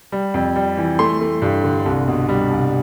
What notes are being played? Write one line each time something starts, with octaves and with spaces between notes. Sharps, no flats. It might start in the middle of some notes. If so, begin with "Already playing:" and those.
G3
F2
G3
E3
A3 C6
A3
G2
D3
C2
B2
G3
C2